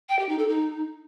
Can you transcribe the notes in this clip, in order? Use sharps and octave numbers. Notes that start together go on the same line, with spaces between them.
G5
G4
D#4
A4
D#4